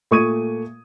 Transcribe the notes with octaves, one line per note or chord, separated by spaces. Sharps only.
A#2 A3 C#6 D#6 G#6 D#7